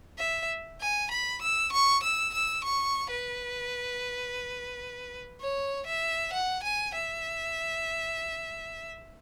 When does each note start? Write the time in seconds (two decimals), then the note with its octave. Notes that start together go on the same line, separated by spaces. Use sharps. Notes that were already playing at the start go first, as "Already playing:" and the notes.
0.18 E5
0.81 G#5
1.11 B5
1.42 E6
1.72 C#6
2.03 E6
2.34 E6
2.64 C#6
3.10 B4
5.41 C#5
5.87 E5
6.33 F#5
6.63 G#5
6.94 E5